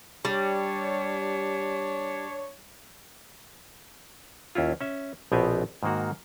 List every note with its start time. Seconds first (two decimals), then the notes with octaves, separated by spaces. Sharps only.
0.25 G3 D4 C#5
4.55 D#2 C#4 E4 F4
4.81 C#4 E5
5.32 A#1 B2 B3 C4 G4 G#5
5.83 G#2 D#3 A#3 F#4